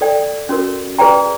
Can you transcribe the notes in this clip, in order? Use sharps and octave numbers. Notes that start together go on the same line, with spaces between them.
A4 D5 G5
C#4 F#4 A#4
G#4 B4 D5 G5 A#5